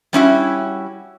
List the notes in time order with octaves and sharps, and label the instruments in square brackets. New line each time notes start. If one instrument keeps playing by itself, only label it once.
[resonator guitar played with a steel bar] G3 C#4 E4 F#4